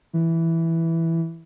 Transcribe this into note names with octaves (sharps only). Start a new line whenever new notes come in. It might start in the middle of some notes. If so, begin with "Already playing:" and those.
E3